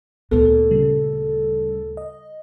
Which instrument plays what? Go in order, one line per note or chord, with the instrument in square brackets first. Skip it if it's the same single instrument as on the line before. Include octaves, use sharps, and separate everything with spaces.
[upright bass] D2 A#2 [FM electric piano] B3 [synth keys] A4
[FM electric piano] C#3 G3
D#5